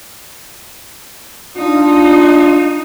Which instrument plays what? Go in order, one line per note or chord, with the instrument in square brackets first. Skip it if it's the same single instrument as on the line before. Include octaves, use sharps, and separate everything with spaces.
[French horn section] D4 F4 [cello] D#4